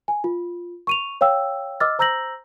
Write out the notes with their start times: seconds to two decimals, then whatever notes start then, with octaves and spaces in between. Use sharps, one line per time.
0.08 G#5
0.24 F4
0.87 C#6 D#7 F7
1.21 C#5 F5 G5 E6
1.80 D#5 D6 E6 F6 A6
1.99 C5 A#5 E6 G6 A#6 F#7